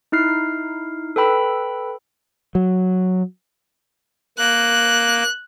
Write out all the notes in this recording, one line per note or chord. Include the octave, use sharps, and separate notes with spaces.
D#4 E4 F6 C7
A4 B4 G5 B5 E6
F#3
A#3 F#6